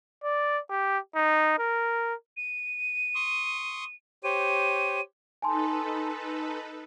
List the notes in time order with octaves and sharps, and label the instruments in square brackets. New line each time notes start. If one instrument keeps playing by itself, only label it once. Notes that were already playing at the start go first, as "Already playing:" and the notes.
[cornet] D5
G4
D#4
A#4
[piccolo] D#7
[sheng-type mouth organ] C6 C#6 D#6
[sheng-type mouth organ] G4 C5 C#5 [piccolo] D#7
[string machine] D#4 A4 B4 [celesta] G#5 A5 C6